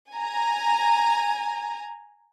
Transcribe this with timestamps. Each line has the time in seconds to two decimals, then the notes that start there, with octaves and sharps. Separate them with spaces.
0.11 G#5 A#5